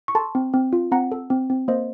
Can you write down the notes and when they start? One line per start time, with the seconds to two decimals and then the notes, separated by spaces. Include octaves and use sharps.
0.08 C#6
0.15 A4 A5 C6
0.35 C4
0.53 C4
0.73 F4
0.91 C4 F#5 A#5
1.12 A4
1.30 C4
1.50 C4
1.68 A#3 C5 D#5